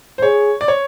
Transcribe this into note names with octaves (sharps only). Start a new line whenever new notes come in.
C5
G#4 C#5
D5
C#5